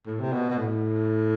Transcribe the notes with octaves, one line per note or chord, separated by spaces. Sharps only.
A2
C3
B2
B2
A2